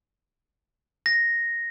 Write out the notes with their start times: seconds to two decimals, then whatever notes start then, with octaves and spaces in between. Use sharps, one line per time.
1.06 A#6